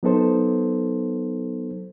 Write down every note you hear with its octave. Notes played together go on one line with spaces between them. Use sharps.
F#3 B3 D#4 A4 C5